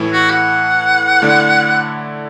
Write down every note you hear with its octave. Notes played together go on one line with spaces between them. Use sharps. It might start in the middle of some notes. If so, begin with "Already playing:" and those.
Already playing: A2 E3 A3 E4
F#4
F#5
D3 A3 E4 D5